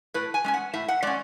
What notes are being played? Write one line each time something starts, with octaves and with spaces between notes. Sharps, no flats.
A2 B4
G#5
G#3 C#4 G#5
F#5
A2 E5
F#5
G#3 C#4 D5